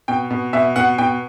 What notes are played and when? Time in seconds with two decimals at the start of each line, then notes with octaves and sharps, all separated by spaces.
0.08 B2 G5
0.31 B2
0.53 B2 E5
0.76 B2 F#5
0.98 B2 G5